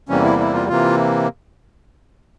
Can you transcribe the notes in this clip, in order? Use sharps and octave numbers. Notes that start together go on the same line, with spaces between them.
E2 C3 E3 G3 A#3 C#4
E4
E4
F4
C3 E3 A#3 F4